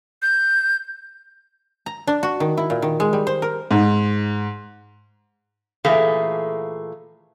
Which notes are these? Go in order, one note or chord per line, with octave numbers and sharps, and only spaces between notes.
G6
A#5
D4
F#4
D#3
E4
A#2
D#3
G#3
G3
C5
A#4
G#2
A#2 E3 A3 G4 G#4 F5